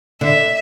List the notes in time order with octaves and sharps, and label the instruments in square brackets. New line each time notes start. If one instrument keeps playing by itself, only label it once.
[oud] D3 [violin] E5